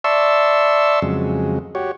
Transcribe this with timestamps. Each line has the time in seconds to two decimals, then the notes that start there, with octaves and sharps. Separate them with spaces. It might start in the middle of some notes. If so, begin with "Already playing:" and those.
0.04 D5 E5 A5 C6 C#6 E6
1.02 F2 C#3 F#3 G#3
1.75 F#4 G4 C#5